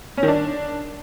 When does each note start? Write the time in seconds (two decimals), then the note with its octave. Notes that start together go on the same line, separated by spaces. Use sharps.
0.17 C#4
0.23 D#3
0.28 D4